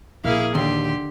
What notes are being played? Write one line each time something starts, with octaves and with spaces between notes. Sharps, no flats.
A#1 A#3 E4 G#4 F5
D#2 D3 G4 C6